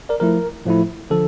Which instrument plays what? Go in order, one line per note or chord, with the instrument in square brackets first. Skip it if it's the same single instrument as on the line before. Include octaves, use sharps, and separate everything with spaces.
[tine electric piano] A#4 D5
F3 A3 E4 A#4
A2 F3 A3 E4
D3 F3 A4